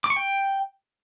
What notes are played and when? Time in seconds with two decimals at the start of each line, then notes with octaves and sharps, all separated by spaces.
0.04 D6
0.10 C#6
0.16 G5